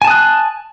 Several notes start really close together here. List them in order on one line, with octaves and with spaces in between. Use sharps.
G#5 A5 D#6 F#6